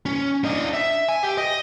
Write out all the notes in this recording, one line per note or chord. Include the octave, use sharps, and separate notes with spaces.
C#4
D4 D#5
E5
G#5
G4
D#5